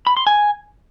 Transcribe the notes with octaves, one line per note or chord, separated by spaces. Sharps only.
B5
C6
G#5